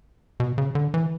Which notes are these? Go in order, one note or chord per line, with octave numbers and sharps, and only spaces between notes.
B2
C#3
D3
E3